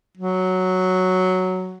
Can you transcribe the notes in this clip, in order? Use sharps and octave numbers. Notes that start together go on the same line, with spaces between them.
F#3